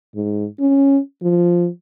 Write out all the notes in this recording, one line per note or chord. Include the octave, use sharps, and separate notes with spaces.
G#2
C#4
F3